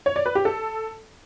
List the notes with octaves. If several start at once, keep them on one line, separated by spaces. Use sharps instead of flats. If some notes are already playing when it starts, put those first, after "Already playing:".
C#5
D5
B4
G4
A4